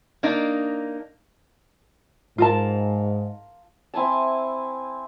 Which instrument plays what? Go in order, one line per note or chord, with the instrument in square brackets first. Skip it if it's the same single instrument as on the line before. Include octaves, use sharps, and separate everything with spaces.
[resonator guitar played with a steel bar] A#3 D4 D#4
[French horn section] G#2 [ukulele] F4 A#4 A5
[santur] C4 E4 G#5 A5